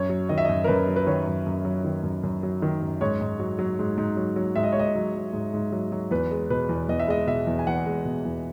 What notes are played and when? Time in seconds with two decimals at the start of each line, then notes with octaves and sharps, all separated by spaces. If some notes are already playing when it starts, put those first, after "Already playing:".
Already playing: F#2 C#5
0.10 F#3
0.29 D#3 D#5
0.38 E5
0.45 D#5
0.49 F#2
0.64 A#4
0.68 F#2 B4
0.88 F#3
0.96 B4
1.07 D#3 C#5
1.27 F#2
1.46 F#2
1.65 F#3
1.84 D#3
2.03 F#2
2.23 F#2
2.43 F#3
2.62 D#3
2.82 F#2
3.01 G#2 C#5
3.21 G#2
3.40 F#3
3.59 F#3
3.79 G#2
3.98 G#2
4.17 F#3
4.36 F#3
4.56 G#2 E5
4.63 D#5
4.72 C#5
4.76 G#2 D#5
4.95 F#3
5.14 F#3
5.33 G#2
5.53 G#2
5.72 F#3
5.92 F#3
6.11 E2 B4
6.31 G#3
6.50 B2 B4
6.69 E2
6.89 E2 D#5
6.99 E5
7.08 G#3 D#5
7.27 B2 E5
7.47 E2
7.59 G#5
7.67 E2 F#5
7.86 G#3
8.05 B2
8.25 E2